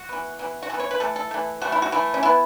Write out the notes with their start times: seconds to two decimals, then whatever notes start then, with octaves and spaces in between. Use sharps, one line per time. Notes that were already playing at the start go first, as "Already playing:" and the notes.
Already playing: F#4
0.09 E3 B3
0.39 E3 B3
0.63 F#4
0.69 E3 A4
0.74 B3
0.80 C#5
0.91 B4
1.00 E3 A3 A4
1.16 A4
1.31 E3 A3
1.62 E3 A3 F#4
1.72 E4
1.82 F#4
1.92 E3 A3 E4
2.14 C#4
2.23 E3 B3 E4